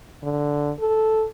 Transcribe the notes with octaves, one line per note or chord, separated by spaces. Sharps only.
D3
A4